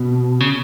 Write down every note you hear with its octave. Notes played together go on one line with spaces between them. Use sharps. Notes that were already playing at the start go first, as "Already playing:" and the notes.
Already playing: B2
C#3